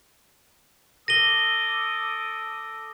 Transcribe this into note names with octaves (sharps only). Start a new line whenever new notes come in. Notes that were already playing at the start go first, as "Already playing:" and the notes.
A4 D6 D#6 A#6 D#7 G7